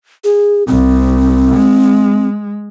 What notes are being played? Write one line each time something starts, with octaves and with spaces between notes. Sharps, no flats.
G#4
C2 C4
G#3